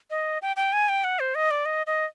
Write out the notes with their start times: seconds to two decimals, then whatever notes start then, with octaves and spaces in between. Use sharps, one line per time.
0.10 D#5
0.42 G5
0.56 G5
0.73 G#5
0.89 G5
1.04 F#5
1.20 C5
1.35 D#5
1.51 D5
1.66 D#5
1.87 D#5